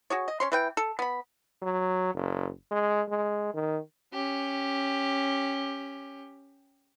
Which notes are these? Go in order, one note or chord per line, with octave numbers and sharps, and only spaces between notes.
F#4 G#4 C#5
D#5
C#4 C#5 C6
E3 B4 G5
A4
B3 B5
F#3
F#1
G#3
G#3
D#3
C#4 G4